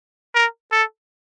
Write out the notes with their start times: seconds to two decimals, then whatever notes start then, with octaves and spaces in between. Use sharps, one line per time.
0.35 A#4
0.72 A4